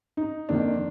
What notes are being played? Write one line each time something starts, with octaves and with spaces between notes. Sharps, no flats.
D#4
F2 D#3 A#3 D4